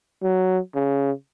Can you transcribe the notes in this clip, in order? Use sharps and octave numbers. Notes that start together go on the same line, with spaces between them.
F#3
C#3